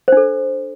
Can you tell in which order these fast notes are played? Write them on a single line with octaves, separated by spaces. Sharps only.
C5 D4 A4